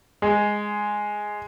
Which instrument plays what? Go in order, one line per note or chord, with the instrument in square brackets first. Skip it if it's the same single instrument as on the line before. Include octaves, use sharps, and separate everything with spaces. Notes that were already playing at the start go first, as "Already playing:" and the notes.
[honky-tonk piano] G#3